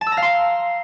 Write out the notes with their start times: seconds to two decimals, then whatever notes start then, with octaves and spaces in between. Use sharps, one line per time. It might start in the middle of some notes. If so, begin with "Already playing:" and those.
0.01 A5
0.06 E6
0.12 A#5
0.17 F5
0.22 C6